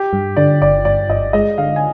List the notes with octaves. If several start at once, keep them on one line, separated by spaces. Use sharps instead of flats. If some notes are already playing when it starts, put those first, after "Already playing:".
Already playing: G4
G2
D3 D5
G1 D5
G2 D5
G1 D#5
G#3 D#5
D3 F5
G#5